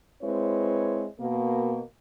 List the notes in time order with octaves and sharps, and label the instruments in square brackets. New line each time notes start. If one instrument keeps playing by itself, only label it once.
[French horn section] G#3 C4 E4 B4 C#5
B2 A#3